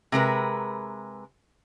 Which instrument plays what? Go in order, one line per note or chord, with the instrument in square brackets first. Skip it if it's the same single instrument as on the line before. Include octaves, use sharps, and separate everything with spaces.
[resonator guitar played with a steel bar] C3 G#3 A#4 B4